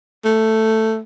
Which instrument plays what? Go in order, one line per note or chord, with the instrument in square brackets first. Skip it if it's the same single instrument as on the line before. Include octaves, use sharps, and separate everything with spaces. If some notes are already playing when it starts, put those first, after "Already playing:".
[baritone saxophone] A3